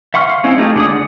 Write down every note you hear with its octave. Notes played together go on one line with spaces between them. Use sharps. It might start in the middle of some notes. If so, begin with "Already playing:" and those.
E5 F#5 C6 C#6 F6
F5
G#3 C4 C#4 D#4 E4
G#3 A3 D#4 F4 G4
D3 D4 G#4 D#6
D5 F#5